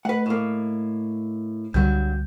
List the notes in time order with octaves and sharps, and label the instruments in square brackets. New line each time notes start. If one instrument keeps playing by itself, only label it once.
[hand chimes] A3 [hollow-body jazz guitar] B4 F#5
[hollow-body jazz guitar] A2 A#3
[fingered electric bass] C#2 D3 G3 [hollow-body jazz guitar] G2 F#3 [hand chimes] G6